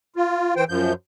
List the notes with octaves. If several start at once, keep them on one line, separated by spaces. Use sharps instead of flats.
F4
E3 C5 G5
F#2 F3 G6